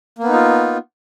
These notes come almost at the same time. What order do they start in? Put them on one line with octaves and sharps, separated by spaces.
A#3 B3 D#4 F4